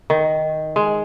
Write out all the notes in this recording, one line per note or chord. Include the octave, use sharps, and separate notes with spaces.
D#3
G#3